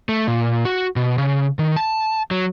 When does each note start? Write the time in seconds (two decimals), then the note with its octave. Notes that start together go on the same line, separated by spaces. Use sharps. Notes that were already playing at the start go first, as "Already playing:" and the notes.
0.09 A3
0.27 A#2
0.65 F#4
0.96 B2
1.18 C#3
1.59 D#3
1.76 A5
2.31 F#3